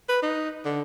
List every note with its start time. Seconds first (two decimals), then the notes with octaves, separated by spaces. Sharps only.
0.09 B4
0.22 D#4
0.65 D3